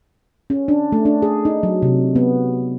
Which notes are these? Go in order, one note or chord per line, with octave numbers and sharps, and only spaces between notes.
C#4
D4
A3
D4
G#4
D#4
F#3
C3
B3